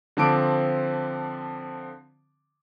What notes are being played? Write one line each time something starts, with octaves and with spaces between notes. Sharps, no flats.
D3 F3 C4 A5 D6 D7